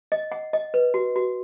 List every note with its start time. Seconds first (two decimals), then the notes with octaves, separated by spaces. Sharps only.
0.12 D#5
0.32 F#5
0.53 D#5
0.74 B4
0.94 F#4
1.16 F#4